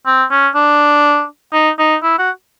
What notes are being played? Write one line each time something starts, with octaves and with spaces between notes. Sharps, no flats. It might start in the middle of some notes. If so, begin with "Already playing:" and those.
C4
C#4
D4
D#4
D#4
E4
F#4